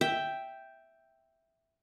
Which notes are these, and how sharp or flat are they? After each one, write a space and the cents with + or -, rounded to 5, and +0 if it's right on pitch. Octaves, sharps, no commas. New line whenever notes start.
E5 +0 G5 +0